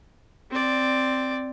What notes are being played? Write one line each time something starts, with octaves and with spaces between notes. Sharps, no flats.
C4 D5